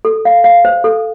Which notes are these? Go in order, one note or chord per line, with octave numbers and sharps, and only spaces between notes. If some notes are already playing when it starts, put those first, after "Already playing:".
A4
F5
F5
C5
A4